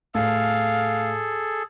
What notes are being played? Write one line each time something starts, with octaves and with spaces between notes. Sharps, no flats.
A2 G#4 A4 F5